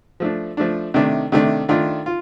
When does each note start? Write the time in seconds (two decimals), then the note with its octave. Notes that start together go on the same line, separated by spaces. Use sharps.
0.20 F3 A3 D4
0.57 F3 A3 D4
0.94 C3 D#3 A3 D4
1.32 C3 D#3 A3 D4
1.69 D#3 A3 D4 F4
2.06 F4